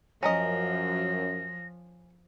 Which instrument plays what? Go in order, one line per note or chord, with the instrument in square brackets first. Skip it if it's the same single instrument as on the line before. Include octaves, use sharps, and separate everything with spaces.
[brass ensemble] F#2 [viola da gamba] F3 [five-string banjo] C#4 A#4 D#5 [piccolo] A#6